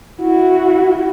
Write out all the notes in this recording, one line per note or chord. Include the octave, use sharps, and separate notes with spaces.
E4 F#4